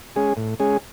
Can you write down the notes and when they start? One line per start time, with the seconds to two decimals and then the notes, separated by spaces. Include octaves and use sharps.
0.16 G#3 C#4 G#4
0.37 A2
0.60 G#3 C#4 G#4